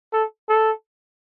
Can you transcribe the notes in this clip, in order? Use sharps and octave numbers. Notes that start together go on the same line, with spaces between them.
A4
A4